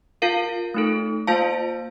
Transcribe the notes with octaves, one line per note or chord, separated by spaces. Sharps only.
F4 A#4 F5
A3 D#4 A4
A#3 F4 C5 F5 A5